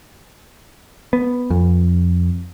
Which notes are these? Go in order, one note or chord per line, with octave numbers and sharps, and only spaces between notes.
B3
F2